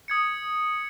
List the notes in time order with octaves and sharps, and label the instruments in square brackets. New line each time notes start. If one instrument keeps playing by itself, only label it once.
[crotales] D#6 G#6 C#7